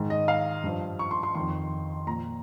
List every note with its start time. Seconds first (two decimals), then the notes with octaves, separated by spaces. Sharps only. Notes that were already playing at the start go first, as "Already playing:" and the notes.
Already playing: G#2 D#3
0.10 D#5
0.28 F5
0.64 G2 F3
0.99 C#6
1.11 C6
1.23 C6
1.35 F2 D#3 C6
2.07 A#2 F3 A#5